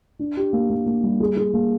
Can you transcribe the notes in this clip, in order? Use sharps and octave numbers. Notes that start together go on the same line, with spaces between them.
D4
G4
A#3
A#3
A#3
G3
G#4
G#4
A#3